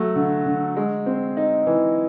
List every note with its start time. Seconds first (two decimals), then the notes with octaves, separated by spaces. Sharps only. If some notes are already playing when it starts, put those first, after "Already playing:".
Already playing: F#3 A3
0.15 D3
0.46 D3
0.76 G#3
1.06 C4
1.37 D#4
1.67 E3